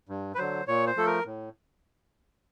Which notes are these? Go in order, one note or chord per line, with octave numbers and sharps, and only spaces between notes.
G2
B4
D3 F#3 C5
A#2 C#5
C5
F3 A3 A4
A#4
A2